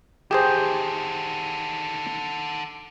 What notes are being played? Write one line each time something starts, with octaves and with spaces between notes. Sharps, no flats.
D3 D#3 G4 G#4 C5